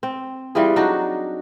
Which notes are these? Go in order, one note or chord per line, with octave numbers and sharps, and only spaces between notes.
C4
E3 G3 F4 G#4
F#3 D4 D#4 F#4